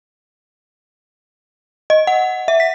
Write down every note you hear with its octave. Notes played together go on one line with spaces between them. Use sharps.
D#5
F#5
E5
B6